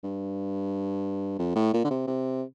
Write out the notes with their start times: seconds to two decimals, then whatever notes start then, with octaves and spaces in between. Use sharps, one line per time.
0.03 G2
1.38 F2
1.55 A2
1.74 A#2
1.84 D3
1.91 C3
2.07 C3